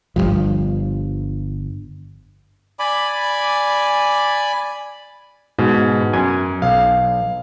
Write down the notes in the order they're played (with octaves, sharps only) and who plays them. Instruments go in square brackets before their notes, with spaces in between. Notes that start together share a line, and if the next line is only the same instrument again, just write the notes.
[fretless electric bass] G1 E2 G2 F3
[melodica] D5 G#5 B5 D6
[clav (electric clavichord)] G#2 [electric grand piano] B2
[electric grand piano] F#2 [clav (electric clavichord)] G#5
[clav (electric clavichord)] B1 [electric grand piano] F5